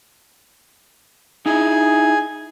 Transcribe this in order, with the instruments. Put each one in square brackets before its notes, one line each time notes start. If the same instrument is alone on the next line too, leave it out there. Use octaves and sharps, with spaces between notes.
[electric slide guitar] D#4 E4 [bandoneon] G#4 G#5